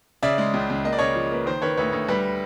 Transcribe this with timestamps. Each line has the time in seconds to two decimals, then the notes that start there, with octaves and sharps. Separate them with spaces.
0.23 C#3 D5 E5
0.38 G#3
0.54 C#2
0.70 C#2
0.84 A#3 D#5
0.93 D5
0.99 C#3 C#5 D#5
1.16 F3
1.32 A#3 B4
1.46 D#3 C5
1.62 D#3 B4 C#5
1.77 D2 B4 C#5
1.93 D2
2.08 G3 B4